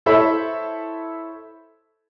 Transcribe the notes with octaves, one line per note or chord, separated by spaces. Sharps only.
E4 A4 C5 C#5 E5 B5